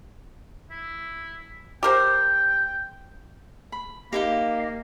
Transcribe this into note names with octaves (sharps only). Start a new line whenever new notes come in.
E4
G4 A#4 C5 G5
B5
A#3 D#4 E4 G4 D#5 F5